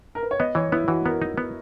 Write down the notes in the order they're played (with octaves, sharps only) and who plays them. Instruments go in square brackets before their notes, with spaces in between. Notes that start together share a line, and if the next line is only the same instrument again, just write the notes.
[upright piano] A#4
B4
C#5
[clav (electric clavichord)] B3 [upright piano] D#5
[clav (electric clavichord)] E3 [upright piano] C#5
[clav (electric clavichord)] B3 [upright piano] E4
[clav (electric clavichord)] E3 [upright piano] F#4
[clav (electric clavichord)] B3 [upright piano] A#4
[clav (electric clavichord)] D#4
B3